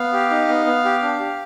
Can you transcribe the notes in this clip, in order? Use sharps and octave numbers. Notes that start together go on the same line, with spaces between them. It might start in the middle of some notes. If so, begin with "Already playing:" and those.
Already playing: B3 F5
G4
D#4
B3
B3
G4
D4
G4